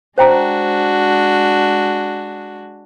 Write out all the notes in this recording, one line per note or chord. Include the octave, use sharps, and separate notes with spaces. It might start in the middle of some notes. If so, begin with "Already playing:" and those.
G#3 D4 F#4 C5 G5 A#5